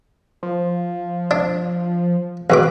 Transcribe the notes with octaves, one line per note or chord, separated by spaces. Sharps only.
F3
D4
E2 B2 B4 D6